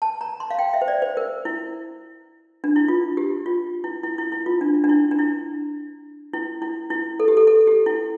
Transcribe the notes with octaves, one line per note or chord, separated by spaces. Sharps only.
A5
A#5
C6
F5
G5
E5
C5
D5
C5
A#4
E4
D4
E4
F4
G4
F4
E4
E4
E4
E4
F4
D4
D4
E4
D4
E4
E4
E4
E4
A4
G4
A4
A4
G4
E4